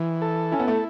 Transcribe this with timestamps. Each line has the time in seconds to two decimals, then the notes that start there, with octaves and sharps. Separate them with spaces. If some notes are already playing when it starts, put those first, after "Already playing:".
Already playing: E3
0.22 A4
0.52 C#4 E4
0.60 B3
0.68 A3